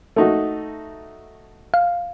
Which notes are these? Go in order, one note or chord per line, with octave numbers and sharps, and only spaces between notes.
A3 D#4 F#4
F5